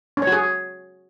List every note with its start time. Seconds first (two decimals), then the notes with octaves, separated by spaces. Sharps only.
0.17 C#4
0.22 C#5
0.27 F#4
0.32 G#4